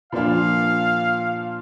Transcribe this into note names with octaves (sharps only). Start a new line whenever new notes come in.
A#2 F3 A#3 D4 F4 F5